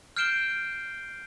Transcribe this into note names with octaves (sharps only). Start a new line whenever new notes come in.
F6 G6 C7 D7 E7 G7